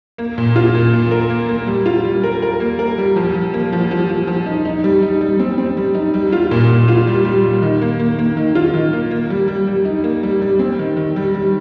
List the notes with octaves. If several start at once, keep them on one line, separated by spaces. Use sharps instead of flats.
A#3
A#2
F4
A#2
A#2
A#4
A#3
A#3
G3
F4
G3
A#4
A#4
A#3
A#4
G3
F3
F3
A#3
F3
F3
F3
F3
D#4
D#4
G3
D#4
G3
C4
C4
G3
D#4
G3
F4
A#2
A#2
F4
G3
G3
G3
D#3
A#3
A#3
A#3
D#3
F4
D#3
A#3
A#3
G3
G3
G3
D#4
A#3
G3
G3
C4
D#3
D#3
G3
G3